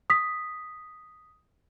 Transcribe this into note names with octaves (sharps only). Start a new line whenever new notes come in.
D#6 B6